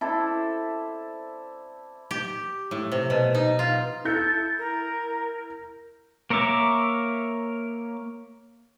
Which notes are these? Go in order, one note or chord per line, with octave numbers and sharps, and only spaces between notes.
E4 A4 C5 D5
G4
A2
C3
B2
D#4
F4
E4 A4 G6 C#7
A#4
A#3 A#4 C#5 E5 D6